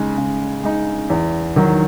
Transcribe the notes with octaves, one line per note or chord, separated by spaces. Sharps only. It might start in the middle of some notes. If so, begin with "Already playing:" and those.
Already playing: C#3 G#3 D#4
C#3
G#3 D#4
E2
D#3 F#3